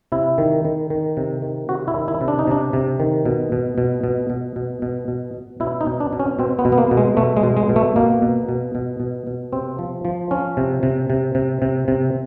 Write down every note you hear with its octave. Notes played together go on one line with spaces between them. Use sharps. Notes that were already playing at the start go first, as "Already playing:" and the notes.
C3 E4
D#3
D#3
D#3
C3
D#3
C3 F#4
E4
D#3
E4
C3
D4
D#4
C3 D4
C3
D#3
B2
B2
B2
B2
B2
B2
B2
B2
B2
B2 E4
D#4
B2
D4
B2
C#4
B2 C4
B3
B2
B3
A#3
B2
G#3
B2 A3
G#3
B2
G#3
B2
A3
B2 A#3
B2
B2
B2
B2
B2
C3 C4
F3
F3
F3 C#4
C3
C3
C3
C3
C3
C3